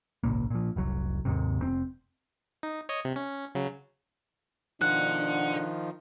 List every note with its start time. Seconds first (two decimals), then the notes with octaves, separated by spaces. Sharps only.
0.24 G#1 C#2 A#2 A#3
0.50 A#2 F3
0.76 F1 C2 F#3
1.25 D#2 G#2 C3
1.59 F1 C4
2.63 D#4
2.89 C#5 D#5 D#6
3.05 C3
3.16 C#4
3.55 C#3 F#3
4.81 B2 D#3 F3 D4 A4 F#5 F#6